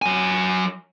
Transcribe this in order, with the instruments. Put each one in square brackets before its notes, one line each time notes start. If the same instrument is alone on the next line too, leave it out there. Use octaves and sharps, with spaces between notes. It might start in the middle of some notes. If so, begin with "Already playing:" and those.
[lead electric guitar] F#3 G#5